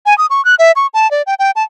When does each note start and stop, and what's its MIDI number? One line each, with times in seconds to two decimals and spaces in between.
0.06 0.16 80
0.18 0.26 87
0.30 0.44 85
0.45 0.55 90
0.59 0.72 76
0.76 0.87 85
0.94 1.10 81
1.11 1.22 74
1.27 1.34 79
1.39 1.51 79
1.56 1.63 81